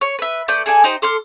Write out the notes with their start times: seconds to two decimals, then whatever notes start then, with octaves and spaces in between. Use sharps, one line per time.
0.01 C#5
0.19 B4 E5
0.48 A3 B4 D5 G6
0.66 G#4 A4 D5 G#5
0.84 D#4 G4 C5 D#5
1.02 A4 C6 D6 F6